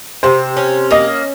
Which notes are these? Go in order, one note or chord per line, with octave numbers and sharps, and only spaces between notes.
C3 C5
C#4
A#3 D#5